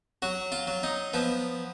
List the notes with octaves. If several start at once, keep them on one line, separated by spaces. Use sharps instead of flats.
F#3 F#4
F4
F#3
D#4
F3 B3